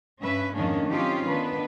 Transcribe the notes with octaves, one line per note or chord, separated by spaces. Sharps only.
G2 C#4 B4 E5
F2 G#2 D#3 A#3 C#4 D4
F#3 C4 C#4 D#4 F4 G4
D#3 B3 D4 B4